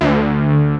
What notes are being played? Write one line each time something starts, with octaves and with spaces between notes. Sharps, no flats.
D2